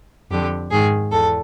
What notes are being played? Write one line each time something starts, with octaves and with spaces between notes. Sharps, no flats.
F2 D3 G4
G#2 D#3 G#4
E2 A4